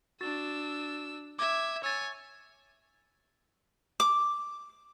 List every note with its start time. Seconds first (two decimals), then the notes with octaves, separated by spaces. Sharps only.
0.21 D4 F#4 E6 A6
1.39 E5 D6 G#6
1.84 C#5 G#5 E6 A6
4.00 D6